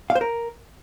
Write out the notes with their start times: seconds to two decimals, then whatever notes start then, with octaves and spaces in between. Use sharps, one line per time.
0.10 F5
0.15 C5
0.21 A#4